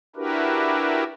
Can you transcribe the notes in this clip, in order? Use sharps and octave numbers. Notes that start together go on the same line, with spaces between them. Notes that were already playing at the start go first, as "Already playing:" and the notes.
D4 E4 F#4 G4 A#4 B4